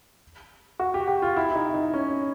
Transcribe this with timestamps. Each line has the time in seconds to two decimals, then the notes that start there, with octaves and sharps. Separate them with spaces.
0.79 F#4
0.94 G4
1.08 G4
1.22 F4
1.37 E4
1.51 E4
1.55 D#4
1.74 D#4
1.94 C#4